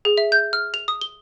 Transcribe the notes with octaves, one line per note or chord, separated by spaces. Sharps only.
G#4
E5
G6
F6
F7
D#6
G7